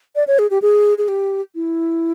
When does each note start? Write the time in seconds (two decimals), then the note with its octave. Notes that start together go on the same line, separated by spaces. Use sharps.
0.16 D5
0.27 C#5
0.39 G#4
0.50 G4
0.62 G#4
0.98 G#4
1.08 G4
1.55 E4